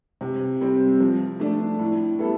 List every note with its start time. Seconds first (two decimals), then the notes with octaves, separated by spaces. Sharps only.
0.21 C3
0.61 G3 C4
1.00 F3
1.40 A3 D4
1.79 A2
2.19 G3 B3 E4 A4